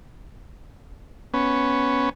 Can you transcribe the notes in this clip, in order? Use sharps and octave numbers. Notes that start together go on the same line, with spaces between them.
B3 C#4